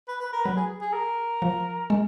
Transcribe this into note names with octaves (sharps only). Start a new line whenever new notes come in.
B4
B4
A#4
F#3 B4
G#4
G#4
A#4
F3
G#3